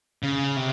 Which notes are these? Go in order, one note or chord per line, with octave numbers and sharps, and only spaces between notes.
C#3
C3